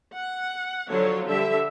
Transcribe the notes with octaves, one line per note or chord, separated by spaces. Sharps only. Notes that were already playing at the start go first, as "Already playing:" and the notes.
F#5
D3 F3 F#3 F4 C#5
D3 G3 E5